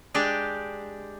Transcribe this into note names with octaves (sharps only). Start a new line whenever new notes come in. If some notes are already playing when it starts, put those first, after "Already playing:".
G#3 D4 G4